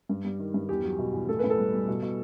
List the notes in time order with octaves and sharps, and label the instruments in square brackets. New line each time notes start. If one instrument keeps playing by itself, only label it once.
[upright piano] G2
G3
D#3
G2
E2 G4
F#3
B2
E2
A2 A4
A2 B4
A4
G3
G3
B2
B2